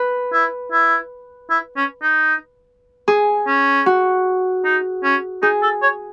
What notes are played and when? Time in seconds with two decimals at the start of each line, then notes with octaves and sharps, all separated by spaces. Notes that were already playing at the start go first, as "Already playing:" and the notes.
Already playing: B4
0.33 E4
0.72 E4
1.50 E4
1.76 C#4
2.02 D#4
3.08 G#4
3.47 C#4
3.86 F#4
4.64 D#4
5.03 C#4
5.42 D#4 G#4
5.62 A4
5.82 C#5